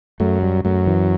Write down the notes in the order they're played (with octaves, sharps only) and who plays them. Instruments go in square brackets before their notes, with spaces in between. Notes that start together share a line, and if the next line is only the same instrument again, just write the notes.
[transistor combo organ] F#2 [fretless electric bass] A3
[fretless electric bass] G3
[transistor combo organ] F#2 [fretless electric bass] A3
[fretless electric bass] E3